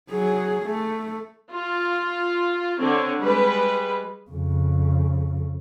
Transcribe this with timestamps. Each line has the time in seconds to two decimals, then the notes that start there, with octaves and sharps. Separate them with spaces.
0.10 F#3 G#4
0.63 A3
1.52 F4
2.79 D3 C4 C#5
3.21 G3 G#3 B4
4.31 F2 C#3